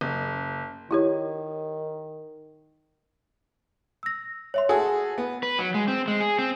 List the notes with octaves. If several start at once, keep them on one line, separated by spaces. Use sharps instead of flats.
F#1
D#3 E4 G4 C#5
E6 A#6
C#5 E5 C6
F#4 G#4 A4 G#5
B3
B4
F#3
G#3
C4
G#3
G#4
C4